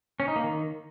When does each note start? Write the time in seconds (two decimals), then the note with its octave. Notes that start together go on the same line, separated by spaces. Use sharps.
0.20 C#4
0.28 D#4
0.36 A#3
0.44 D#3